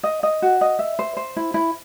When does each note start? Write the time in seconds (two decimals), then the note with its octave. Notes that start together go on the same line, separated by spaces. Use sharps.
0.03 D#5
0.23 D#5
0.42 F#4
0.61 D#5
0.79 E5
0.99 C5
1.17 C5
1.37 E4
1.54 E4